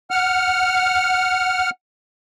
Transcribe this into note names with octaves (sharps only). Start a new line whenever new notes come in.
F#5 F6